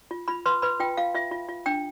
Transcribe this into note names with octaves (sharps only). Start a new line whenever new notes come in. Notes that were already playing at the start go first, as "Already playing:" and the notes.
F4
F4 B5
B4 C6
B4 B5
F4 G5
F4 F5
F4 E5
F4
F4
D4 G5